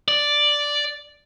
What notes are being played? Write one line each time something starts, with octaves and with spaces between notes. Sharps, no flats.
D5